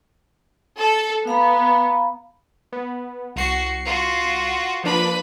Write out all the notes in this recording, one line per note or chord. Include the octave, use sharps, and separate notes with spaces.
A4
B3 F5 A#5 B5
B3
C2 F#4 C7 C#7
F4 F#4
F3 A#3 D4 B4 B5